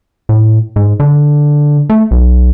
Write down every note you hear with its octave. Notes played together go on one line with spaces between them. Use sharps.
A2
G#2
D3
A3
B1